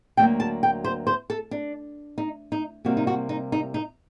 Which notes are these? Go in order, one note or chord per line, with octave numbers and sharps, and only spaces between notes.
D2 C3 F#3 A#3 G5
A5
G5
C5
C5
A4
D4
D#4
D#4
C3 G3 A#3 F#4
D#4
F#4
D#4
D#4
D#4